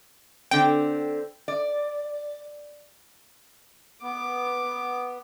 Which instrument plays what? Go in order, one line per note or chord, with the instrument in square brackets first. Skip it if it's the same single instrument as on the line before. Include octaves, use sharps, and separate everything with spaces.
[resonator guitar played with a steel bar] D3 C4 [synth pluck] G5
[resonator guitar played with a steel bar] D5
[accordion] B3 [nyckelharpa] D6